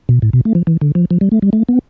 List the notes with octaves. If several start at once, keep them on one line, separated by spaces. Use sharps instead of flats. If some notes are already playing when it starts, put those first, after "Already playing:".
B2
A2
B2
A3
F3
E3
D3
F3
F3
G3
A3
G3
A3
B3